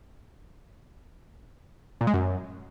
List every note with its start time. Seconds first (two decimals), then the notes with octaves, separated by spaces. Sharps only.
2.01 A#2
2.07 G#3
2.14 F#2